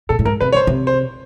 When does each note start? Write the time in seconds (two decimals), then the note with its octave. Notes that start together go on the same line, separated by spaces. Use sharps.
0.09 A#2 A4
0.19 A2
0.25 G#2 A#4
0.41 C3 B4
0.52 C#3 C5 C#5
0.67 C3
0.87 C5